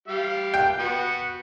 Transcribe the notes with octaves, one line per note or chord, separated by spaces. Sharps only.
G3 G4 F5
G5
B3 F#4